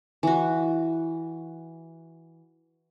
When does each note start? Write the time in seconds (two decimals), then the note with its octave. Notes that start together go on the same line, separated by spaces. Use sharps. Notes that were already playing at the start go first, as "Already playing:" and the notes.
0.23 E3 F#4